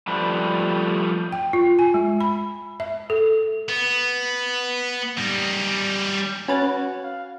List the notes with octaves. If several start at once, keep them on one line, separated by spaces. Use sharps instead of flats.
F3 G3 A3 B4
G5
F4
G#5
G#3
B5
E5
A4
B3
G3 D#4
C#4 F#4 B4 A6
F5